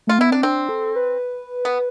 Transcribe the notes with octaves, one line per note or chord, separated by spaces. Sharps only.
A3 F4
B3 E4
C4 D4
C4 D4
A4
B4
B3